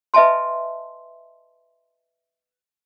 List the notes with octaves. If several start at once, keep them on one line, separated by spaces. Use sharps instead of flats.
B4 D#5 E5 G#5 A5 C6